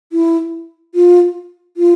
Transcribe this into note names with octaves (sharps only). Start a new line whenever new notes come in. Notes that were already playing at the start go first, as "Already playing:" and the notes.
E4
F4
F4